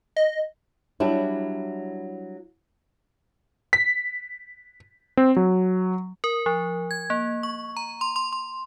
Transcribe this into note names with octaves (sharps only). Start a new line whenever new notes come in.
D#5
F#3 G3 D4 E4
B6
C4
F#3
A#4
F3
G#6
A#3
C#6
A#5
C6
C6
C6